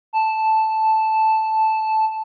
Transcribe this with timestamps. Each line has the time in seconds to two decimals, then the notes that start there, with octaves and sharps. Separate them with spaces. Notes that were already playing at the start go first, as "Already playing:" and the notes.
0.13 A5